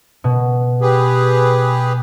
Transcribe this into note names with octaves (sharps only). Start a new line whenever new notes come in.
B2
G4 G#4 B4